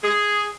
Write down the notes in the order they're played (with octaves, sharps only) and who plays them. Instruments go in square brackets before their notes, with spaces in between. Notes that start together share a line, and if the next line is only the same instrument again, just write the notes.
[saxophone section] G#4